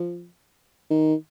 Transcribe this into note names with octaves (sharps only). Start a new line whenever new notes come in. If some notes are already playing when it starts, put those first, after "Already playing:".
Already playing: F3
D#3